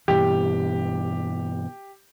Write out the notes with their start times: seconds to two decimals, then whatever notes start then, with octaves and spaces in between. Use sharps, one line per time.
0.08 G2 B2 E3 G4